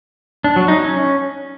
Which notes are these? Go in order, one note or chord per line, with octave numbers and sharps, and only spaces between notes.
D4
F#3
D#4
C#4